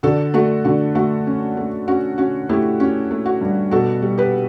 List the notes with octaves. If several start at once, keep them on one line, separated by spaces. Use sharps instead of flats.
D3 F#4 A4
A3 F#4 A4
D3 F#4
A3 F#4
C#4
A3
C#4 F#4
C#4 F#4
A3 E4 G4
C#4 F#4
A3
F#4
G2
B2 F#4 A4
G3
G4 B4